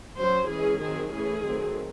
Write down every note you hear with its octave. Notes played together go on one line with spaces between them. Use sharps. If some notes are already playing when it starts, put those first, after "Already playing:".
F#3 C#4 C5
E3 G#3 C#4 G#4
D#3 F#3 C4 G#4
E3 A3 C#4 G#4
D#3 F#3 A3 C4